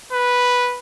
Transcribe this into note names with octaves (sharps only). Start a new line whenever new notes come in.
B4